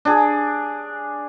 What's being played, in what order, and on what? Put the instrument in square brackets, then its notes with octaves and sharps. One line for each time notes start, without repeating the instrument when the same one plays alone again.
[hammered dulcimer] D4 G#4